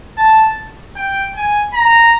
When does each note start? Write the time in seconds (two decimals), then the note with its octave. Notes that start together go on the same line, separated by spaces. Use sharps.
0.18 A5
0.96 G5
1.36 G#5
1.74 A#5